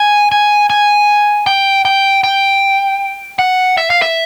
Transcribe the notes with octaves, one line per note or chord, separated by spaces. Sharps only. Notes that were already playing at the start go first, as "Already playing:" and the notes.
Already playing: G#5
G#5
G#5
G5
G5
G5
F#5
E5
F5
E5